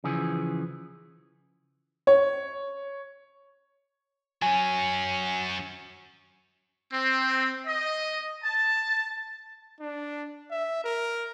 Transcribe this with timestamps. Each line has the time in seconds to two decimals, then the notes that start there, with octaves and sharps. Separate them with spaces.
0.04 C#3 E3 F3 G#4
2.07 C#5
4.42 F#3 C#4 G#5
6.93 C4
7.67 D#5
8.43 A5
9.81 D4
10.51 E5
10.85 A#4